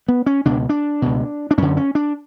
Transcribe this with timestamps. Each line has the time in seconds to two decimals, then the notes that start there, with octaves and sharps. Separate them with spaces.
0.08 B3
0.26 C#4
0.45 C#2 B2 D4
0.69 D4
1.02 C#2 B2
1.51 D4
1.58 F#2 D3 C#4
1.77 C#4
1.95 D4